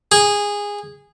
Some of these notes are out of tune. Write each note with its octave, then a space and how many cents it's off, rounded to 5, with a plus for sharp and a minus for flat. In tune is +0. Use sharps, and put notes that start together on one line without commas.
G#4 -15